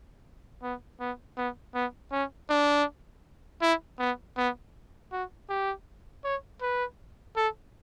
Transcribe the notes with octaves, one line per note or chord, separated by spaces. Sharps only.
B3
B3
B3
B3
C#4
D4
E4
B3
B3
F#4
G4
C#5
B4
A4